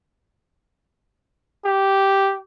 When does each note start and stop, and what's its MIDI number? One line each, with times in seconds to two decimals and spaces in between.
1.65 2.36 67